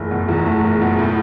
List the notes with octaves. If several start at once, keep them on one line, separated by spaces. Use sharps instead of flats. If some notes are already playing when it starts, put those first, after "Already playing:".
Already playing: F#1 E2 A3
B2
E2
A3
F#1
B2
A2